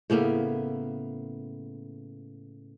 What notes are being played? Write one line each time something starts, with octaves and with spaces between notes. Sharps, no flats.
A2 C#3 A#3 B3